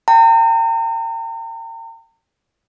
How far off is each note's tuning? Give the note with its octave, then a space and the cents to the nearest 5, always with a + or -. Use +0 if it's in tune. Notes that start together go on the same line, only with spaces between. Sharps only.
G5 +5 A#5 -40